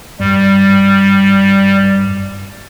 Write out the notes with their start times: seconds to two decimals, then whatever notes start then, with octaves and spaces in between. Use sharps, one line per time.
0.20 G2 G3